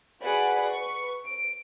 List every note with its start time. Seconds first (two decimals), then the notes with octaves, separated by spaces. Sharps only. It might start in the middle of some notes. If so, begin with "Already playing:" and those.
0.21 F#4 G#4 B4 D5 F#5 B5
0.71 B4 C#6
1.25 D7